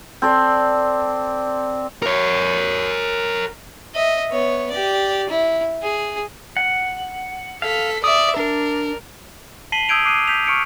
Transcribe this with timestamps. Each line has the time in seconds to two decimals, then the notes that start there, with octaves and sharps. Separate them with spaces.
0.22 C4 A4 D5
2.02 A#4 C#5
3.95 D#5 E5
4.31 B3 C#5
4.71 G4 D5
5.30 E4
5.82 G#4
6.57 F#5
7.62 A4 F5 B6
8.04 D5 E5 D#6
8.36 D4 A#4
9.72 A5 B6 C7 D#7 F#7 G7
9.89 D#6 E6 G6 G#6 D7 F7
10.05 D6 D#6 F#6 C7 D7 D#7
10.28 G6 B6 F7
10.47 C#6 F6 C#7 D7